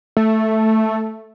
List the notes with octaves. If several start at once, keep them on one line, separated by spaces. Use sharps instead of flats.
A3